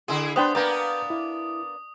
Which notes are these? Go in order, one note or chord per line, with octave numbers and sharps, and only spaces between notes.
D3 E4 G#4 C6
B3 D4 B4 C5 G5 C6 D#6
A#3 B3 D4 B4 D5 A#5 G6
E4